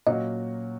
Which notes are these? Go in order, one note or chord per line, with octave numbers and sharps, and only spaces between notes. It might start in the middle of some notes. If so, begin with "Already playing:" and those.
A#2 F#3 A#3 C#4 F#4 D#5